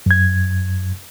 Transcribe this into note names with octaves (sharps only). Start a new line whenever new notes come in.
F#2 G#6